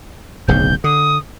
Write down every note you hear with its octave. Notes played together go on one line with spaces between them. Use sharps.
D1 B1 C#3 G6
D3 D#6